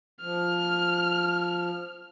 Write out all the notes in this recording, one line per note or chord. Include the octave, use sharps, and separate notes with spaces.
F3 F6